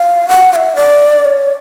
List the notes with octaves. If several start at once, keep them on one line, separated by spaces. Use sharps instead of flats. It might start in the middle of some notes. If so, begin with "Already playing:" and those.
Already playing: F5
F#5
F5
E5
D5
C#5